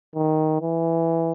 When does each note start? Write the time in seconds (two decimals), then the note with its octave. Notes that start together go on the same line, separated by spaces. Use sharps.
0.16 D#3
0.62 E3